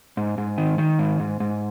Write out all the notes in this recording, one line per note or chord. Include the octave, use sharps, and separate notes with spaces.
G#2
G#2
D#3
D#3
G#2
G#2
G#2